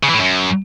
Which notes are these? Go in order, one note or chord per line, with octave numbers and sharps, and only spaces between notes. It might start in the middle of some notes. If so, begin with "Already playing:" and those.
C#3
E3
A2
F#2